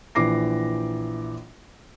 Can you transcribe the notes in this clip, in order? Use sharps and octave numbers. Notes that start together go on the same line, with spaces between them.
A#1 E3 D6 A#6 C7